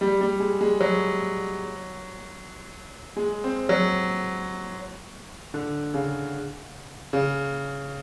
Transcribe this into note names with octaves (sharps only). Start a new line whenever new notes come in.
G3
G3
G#3
G#3
F#3
G#3
C4
F#3
D3
C#3
C#3